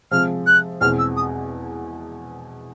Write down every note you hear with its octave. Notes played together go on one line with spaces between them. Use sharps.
C3 F3 G#3 F6
F#6
E2 B2 G#3 C4 F6
E6
D#6